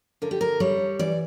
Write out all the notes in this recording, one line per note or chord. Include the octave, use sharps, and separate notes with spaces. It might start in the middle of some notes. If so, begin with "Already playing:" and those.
D3 A#4
G4
A#4
G3 C#5
E3 D5